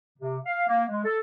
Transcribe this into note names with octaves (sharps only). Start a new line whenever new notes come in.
C3
F5
A#3
G#3
A4